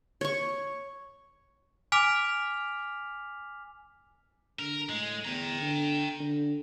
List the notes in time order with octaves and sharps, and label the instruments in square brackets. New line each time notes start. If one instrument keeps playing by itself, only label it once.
[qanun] C#5 C#6
[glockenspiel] G#5 D6 F6 B6 F7
[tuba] D3 [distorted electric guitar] A#4
[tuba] A2 [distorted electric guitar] G#3
[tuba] E2 [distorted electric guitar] G5 A#5
[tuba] D3
D3